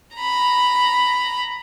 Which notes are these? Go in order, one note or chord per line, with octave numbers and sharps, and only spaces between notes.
A#5 B5